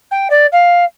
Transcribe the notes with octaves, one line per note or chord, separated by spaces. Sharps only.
G5
D5
F5